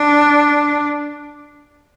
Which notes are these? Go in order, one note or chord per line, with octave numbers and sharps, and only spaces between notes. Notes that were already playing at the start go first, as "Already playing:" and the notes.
Already playing: D4